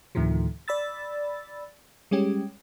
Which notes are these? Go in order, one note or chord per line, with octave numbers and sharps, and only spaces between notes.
D2 A2 C3 D#3 F3
D5 B5 E6 A6
G3 G#3 C#4 G4